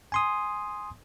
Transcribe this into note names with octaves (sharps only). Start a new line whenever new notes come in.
G#5 C6 D#6